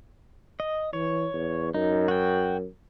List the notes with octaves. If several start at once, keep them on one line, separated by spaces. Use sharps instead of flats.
D#5
E3 C#5
E2
F#2 D#4
F#4 G5